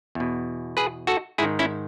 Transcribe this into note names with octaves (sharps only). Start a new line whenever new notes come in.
E2 B2
G#4 B4
F#4 A4
G#2 D#3 E4 G#4
C#4 E4